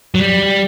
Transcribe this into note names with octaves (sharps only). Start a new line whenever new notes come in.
F#3
G3